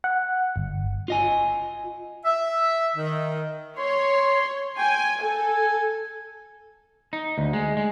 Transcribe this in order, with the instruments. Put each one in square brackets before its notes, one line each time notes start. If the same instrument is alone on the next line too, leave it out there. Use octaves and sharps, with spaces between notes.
[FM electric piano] F#5
G1
[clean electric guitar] F4 D#5 G#5
[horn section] E5
D#3
[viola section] C#5 [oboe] C6
[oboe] G5 [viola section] G#5
[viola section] A4 [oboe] G#5
[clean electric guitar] D#4
D2
G#3
G#3